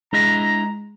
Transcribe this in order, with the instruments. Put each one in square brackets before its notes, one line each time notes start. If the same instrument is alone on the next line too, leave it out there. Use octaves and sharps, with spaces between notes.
[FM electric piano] G#3 [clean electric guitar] D4 E4 D#5 [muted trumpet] A#5